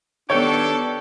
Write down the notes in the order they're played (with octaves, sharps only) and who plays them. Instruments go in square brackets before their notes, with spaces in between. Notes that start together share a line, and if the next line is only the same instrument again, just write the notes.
[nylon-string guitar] D#3 B3 [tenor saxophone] D4 [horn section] G4 A4 [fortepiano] C#5